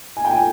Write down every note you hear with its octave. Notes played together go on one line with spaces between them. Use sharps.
G#5
G5
G#5